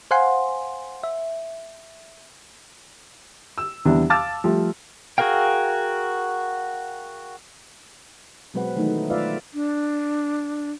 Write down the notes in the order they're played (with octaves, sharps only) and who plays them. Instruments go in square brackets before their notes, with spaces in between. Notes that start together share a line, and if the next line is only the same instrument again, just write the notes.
[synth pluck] C5 F5 F#5 G#5 C6
E5
[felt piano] E6
E2 C3 E3 G3 B3 D4
F5 A5 D6 E6 F6 A6
F3 G3 A3
[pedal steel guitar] F#4 G#4 A#4 F5 G5
[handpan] B2 F#3 G#3 C4 B4 F#5
D#3 E3 F#3 A3 D#4
F4 B4 D5 E5 F5
[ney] D4